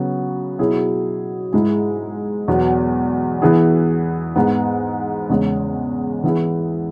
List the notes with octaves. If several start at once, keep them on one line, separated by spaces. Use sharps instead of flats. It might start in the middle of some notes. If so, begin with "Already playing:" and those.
Already playing: C#3 F#3 B3 F#4
B2 F#3 E4 G#4
G#2 G#3 E4 G#4
E2 B2 F#3 B3
E3 B3 E4 G#4
G#2 G#3 B3
E2 C#3 G#3
E3 B3 E4 G#4